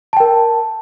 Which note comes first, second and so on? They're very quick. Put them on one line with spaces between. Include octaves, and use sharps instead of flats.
A5 G5 A#4